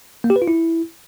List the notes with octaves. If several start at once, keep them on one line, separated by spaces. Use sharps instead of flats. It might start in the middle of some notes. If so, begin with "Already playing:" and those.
A#3
G4
B4
F4
E4